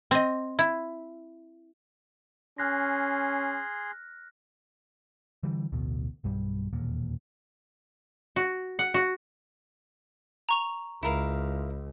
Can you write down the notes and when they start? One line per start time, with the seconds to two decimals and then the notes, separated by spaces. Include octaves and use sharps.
0.11 C4 D#5
0.59 E4
2.58 C#4 G#4 C6 F6 F#6 A#6
5.43 D3 E3 G3
5.72 A1 D2 B2
6.24 B1 G2 G3
6.73 E1 D#2 A#2
8.36 F#4
8.79 F#5
8.94 F#4
10.49 A#5 C#6 F7
11.03 C#2 E4 A#4 F5